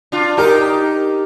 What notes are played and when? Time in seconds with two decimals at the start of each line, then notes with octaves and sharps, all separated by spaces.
0.12 D4 F4
0.37 D#4 G4 A#4